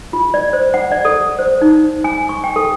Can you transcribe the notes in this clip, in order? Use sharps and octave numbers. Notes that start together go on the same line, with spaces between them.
F4
D5
C5
F#5
D5
A4
C5
D#4
G#5
C#6
G5
A4